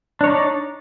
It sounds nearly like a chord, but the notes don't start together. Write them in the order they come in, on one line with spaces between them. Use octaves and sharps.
D4 C#5 D#4 D5